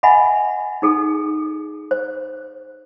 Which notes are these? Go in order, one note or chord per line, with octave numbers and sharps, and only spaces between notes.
D#5 E5 F#5 G#5 B5
D#4 G#4 A4
C5